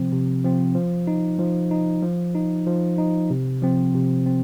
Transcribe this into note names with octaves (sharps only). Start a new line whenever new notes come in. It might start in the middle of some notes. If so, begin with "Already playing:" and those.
Already playing: C3 F3 C4
C3
F3 C4
F3
D#4
F3
D#4
F3
D#4
F3
D#4
C3
F3 C4
C3
C4